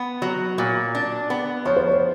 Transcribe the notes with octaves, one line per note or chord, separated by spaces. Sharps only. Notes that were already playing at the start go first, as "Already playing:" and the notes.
Already playing: B3
F#3
A#2
D4
B3
F3 C#5
C5
C#5